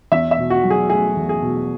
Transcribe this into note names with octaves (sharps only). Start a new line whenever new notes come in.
E2 E5
E5
B2
F#4
F#3
G#4
A3 G#4
E2
G#4
B2